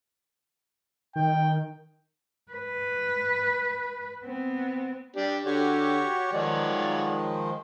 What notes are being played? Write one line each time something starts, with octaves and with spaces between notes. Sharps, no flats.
D#3 G5
B4
B3 C4
D4 G4
D3 F#4 G4 C#5
D#3 F3 G#3 C#5 D5 F#5